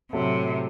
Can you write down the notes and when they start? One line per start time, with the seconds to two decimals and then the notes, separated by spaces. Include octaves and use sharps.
0.12 A2 C3 F#3 A3